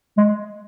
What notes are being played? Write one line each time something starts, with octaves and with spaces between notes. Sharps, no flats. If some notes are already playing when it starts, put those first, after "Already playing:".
G#3